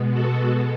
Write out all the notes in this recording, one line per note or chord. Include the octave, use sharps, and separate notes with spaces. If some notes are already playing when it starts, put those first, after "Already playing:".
Already playing: B2 G#3 B3
F#4 A4